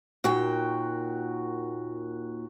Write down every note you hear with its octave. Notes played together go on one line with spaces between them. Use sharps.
D#2 A#2 F#4 G5